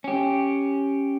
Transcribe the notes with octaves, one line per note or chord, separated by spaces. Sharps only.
C#4 G4